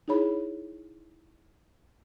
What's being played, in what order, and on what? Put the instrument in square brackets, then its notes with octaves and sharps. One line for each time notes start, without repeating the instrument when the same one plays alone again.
[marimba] D#4 E4 G#4 C#5 B5